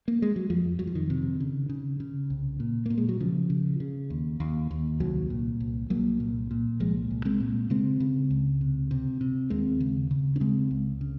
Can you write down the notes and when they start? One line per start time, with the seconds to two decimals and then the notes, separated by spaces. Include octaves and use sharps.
0.08 A#3
0.22 G#3
0.36 F#3
0.50 F2 F3
0.79 F2 F#3
0.87 F3
0.95 D#3
1.10 C3
1.40 C#3
1.69 C#3
2.00 C#3
2.30 C2
2.60 A#2
2.86 A#2 A#3
2.98 G#3
3.09 F#3
3.20 C#3 F3
3.50 C#3
3.80 C#3
4.10 D#2
4.40 D#2
4.71 D#2
5.00 C2 D#3 F#3
5.30 A#2
5.60 C2
5.90 C2 F#3 A#3
6.20 A#2
6.51 A#2
6.80 C2 F3 G#3
7.11 C2
7.25 G#3 C4
7.40 A#2
7.70 C#3 G#3 C4
8.00 C#3
8.31 C#2
8.61 C3
8.91 C3
9.21 C3
9.50 D#2 G#3 C4
9.80 C#3
10.11 C#3
10.36 C#4
10.40 C#3 G#3 C4
10.71 C#2
11.01 C#3